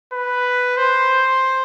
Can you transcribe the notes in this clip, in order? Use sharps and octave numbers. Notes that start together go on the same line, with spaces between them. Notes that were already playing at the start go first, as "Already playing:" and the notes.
B4
C5